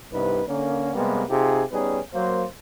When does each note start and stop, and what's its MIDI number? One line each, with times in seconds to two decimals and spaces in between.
0.12 0.42 36
0.12 0.42 43
0.12 0.42 48
0.12 0.42 59
0.12 0.42 63
0.12 0.42 71
0.48 0.94 50
0.48 0.94 58
0.48 0.94 61
0.95 1.24 48
0.95 1.24 55
0.95 1.24 56
0.95 1.24 58
0.95 1.24 59
1.30 1.64 48
1.30 1.64 63
1.30 1.64 65
1.30 1.64 67
1.30 1.64 68
1.72 1.99 55
1.72 1.99 59
1.72 1.99 61
1.72 1.99 63
1.72 1.99 68
1.72 1.99 71
2.14 2.45 54
2.14 2.45 58
2.14 2.45 72